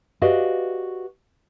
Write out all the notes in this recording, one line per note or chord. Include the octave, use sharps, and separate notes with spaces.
F#4 G4 B4 D5 D#5 F5